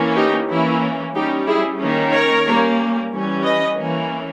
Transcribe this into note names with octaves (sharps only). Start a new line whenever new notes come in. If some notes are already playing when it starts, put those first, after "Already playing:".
Already playing: E3 A#3 C#4
D#4 G4
E3 A#3 C#4 E4
G3 C#4 D#4 G4
E4 G#4
D#3 A#3 C#4
A#4 C#5
G3 A#3 C#4
E3 G3 C#4
B4 D#5
E3 A#3 C#4